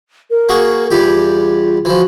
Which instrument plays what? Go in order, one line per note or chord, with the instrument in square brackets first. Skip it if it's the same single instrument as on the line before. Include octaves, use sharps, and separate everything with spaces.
[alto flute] A#4
[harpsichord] A#3 F#4 G#4
[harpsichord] E2 G3 G4 [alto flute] F4
[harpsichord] E3 F3 [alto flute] F#4